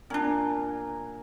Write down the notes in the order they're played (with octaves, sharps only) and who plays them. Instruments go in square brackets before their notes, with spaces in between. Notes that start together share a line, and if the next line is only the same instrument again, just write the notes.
[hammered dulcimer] A#2 A#4 G#5 [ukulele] C#4 D4